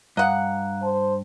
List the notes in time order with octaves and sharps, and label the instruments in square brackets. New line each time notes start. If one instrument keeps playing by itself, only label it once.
[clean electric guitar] G2 [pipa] D#5 F#5 [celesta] F5 A#5 F#6
[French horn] C5 [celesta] A5